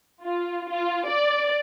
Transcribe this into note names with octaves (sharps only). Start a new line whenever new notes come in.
F4
F4
D5